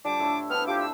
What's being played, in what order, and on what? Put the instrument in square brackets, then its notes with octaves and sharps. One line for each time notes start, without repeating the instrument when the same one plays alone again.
[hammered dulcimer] D3 F3 G3 [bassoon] D4 [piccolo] D6
[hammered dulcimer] A2 E4 A4
[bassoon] B3 [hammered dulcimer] C4 D4 C5 [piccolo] F6
[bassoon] F4 [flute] G4 [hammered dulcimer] C5 A5 [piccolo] D6
[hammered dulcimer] E5 [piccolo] E6